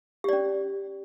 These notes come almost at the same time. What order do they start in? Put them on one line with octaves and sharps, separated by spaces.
G4 D5 C#4